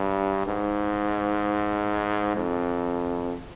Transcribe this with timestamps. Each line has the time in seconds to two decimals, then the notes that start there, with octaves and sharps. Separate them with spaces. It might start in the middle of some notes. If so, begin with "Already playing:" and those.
Already playing: G2
0.47 G#2
2.36 F2